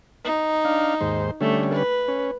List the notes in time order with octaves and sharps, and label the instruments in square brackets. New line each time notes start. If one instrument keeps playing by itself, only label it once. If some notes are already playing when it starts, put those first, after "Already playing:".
[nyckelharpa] D#4
[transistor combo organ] D4 F5
D#2 G#2 C5
[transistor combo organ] D3 G3 C#4 [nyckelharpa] A3
[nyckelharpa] B4
[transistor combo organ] C#4